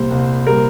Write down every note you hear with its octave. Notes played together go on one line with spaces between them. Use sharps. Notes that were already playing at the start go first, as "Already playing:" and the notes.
Already playing: C2 A#2 G3 C5
C2
A#2 G3 A#4